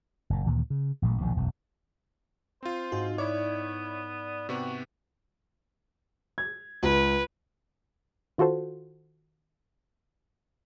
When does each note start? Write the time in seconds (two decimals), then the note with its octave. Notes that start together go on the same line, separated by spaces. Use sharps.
0.30 F#1 A#2
0.46 D2 A#2 D#3 E3
0.70 C#3
1.02 A1 A#2 F#3 A3
1.21 A#1 D#2 B2 F3
1.37 E1 B1 F#2
2.63 C4 F4 C5
2.92 G#2 F#4
3.18 B3 E4 C#5 D5
4.49 C3 B3 F#4 G4
6.38 G#6
6.83 C#2 B4
8.38 D#3 F4 F#4 A4 C5